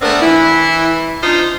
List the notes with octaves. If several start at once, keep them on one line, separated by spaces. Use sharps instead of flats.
A3 B3 C4 D4 A#4
E3 E4
D4 D#4 F4 C5